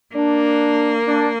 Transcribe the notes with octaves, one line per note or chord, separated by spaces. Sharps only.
A#3 D4
D4